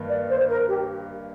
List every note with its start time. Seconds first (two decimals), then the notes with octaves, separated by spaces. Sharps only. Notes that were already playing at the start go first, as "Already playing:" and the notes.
Already playing: G2 D#3 A#3
0.08 D5
0.29 C5
0.48 A#4
0.67 G4